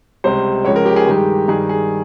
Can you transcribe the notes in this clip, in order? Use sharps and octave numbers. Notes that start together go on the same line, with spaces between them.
C#2 C3 G3 C5
C#2 C#3 F3 G#3 C#5
A#4
G4
G#4
G2 D#3 G#3 G4
G2 D#3 G3 G#4
G#4